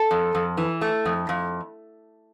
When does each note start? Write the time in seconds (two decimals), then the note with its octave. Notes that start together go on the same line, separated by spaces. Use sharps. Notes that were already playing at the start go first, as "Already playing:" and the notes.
Already playing: A4
0.11 F2
0.35 F2
0.57 E3
0.81 A3
1.06 F2
1.29 F2